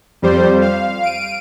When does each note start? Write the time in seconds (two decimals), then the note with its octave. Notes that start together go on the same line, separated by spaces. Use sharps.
0.22 F2 G3 C5
0.61 F5
1.03 D7 D#7